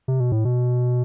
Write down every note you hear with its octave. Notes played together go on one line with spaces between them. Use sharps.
C3
B2
A2
B2